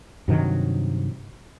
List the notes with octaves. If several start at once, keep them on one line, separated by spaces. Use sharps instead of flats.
G2 C3 D#3 F#3